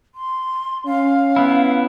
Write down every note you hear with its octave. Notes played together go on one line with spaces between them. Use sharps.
C6
C#4 F5
B3 E4